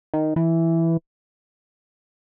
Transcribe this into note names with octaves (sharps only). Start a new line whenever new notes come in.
D#3
E3